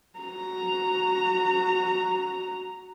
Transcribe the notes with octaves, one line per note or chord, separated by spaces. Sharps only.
F#4 A#5